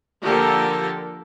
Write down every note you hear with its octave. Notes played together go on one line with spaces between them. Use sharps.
D3 F3 A#3 G4 A4 A#4